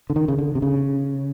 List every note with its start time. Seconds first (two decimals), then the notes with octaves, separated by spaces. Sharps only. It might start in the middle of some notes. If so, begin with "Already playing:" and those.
0.10 D3
0.16 D#3
0.28 C#3
0.38 D3
0.55 C3
0.62 C#3